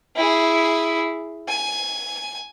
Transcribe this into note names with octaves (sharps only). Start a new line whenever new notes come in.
E4 G#4
G#5